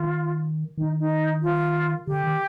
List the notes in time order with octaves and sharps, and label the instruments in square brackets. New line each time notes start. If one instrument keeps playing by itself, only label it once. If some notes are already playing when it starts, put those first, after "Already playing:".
Already playing: [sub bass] D#3 [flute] F4
[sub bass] D#3 [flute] D#4
[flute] D#4
F4
[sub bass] D3 [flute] G4
[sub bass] D#3